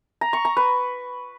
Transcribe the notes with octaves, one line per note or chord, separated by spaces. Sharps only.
A#5
C#6
A#5
B4